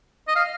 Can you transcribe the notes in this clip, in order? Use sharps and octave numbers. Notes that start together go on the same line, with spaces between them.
D#5
F5